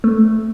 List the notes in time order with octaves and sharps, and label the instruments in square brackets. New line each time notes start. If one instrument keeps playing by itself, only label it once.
[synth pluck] A3